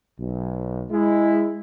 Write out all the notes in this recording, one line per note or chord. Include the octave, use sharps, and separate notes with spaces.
B1
G#3 E4